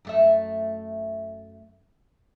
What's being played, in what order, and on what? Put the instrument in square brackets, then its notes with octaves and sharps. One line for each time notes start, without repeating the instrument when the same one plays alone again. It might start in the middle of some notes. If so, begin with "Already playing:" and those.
[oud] F#2 A3 E5